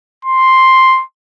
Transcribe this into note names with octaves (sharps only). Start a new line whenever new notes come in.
C6